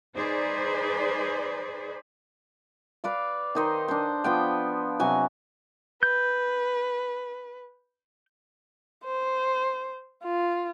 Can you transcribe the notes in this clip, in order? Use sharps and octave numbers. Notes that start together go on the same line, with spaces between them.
D#4 G#4 B4 C5 D5
B4 D5 F5
D#3 D#4 C5
D4 C5
F3 B3 G5
C3 F#3 G#5
B4 G6
C5
F4